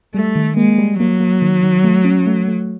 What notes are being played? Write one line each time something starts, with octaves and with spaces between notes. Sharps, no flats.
G3 A3
D#3
G#3 A#3
G3
F#3 A#3
A#3
D#3
D#3
A3
C#4
A3
A3